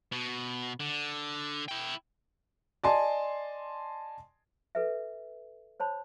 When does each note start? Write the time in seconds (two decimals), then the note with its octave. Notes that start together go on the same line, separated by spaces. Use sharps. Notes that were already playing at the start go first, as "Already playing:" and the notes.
0.12 B2
0.80 D3
1.68 E4 G5
2.84 D5 D#5 G#5 A5 C6
4.75 A4 B4 E5
5.80 C5 C#5 A5 B5